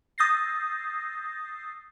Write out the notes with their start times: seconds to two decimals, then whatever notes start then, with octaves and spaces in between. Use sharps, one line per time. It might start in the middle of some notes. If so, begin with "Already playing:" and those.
0.18 D#6 E6 G6 A6 A#6 C7